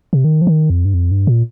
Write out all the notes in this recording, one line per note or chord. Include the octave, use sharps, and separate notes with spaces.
C3
D#3
F3
D#3
F2
G2
F2
G2
A#2